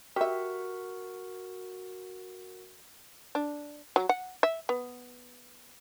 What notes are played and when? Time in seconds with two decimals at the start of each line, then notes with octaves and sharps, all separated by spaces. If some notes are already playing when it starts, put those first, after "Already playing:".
0.16 F#4 G4 A#4 E5 F#5
3.35 D4
3.96 F#3
4.09 F#5
4.43 E5
4.69 B3